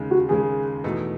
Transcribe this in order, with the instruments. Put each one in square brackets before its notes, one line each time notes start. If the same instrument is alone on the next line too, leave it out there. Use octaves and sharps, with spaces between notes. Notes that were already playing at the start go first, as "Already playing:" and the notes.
Already playing: [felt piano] D#2 C#3 G#3
[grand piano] F#4
[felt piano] D#2 C#3 G#3 [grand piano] G#4
[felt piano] E2 B2 A3 D#4